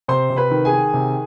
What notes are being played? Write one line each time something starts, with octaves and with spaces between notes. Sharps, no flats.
C3 C5 C6
C3
B4 B5
D#3
G#4 G#5
D#3
C3